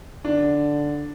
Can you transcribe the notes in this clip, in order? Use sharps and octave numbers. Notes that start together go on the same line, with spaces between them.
D3 D4